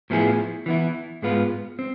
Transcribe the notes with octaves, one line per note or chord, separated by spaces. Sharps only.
A2 F3 B3 E4 G#4
E3 B3 E4
G#2 G#3 B3 F4 B4
C4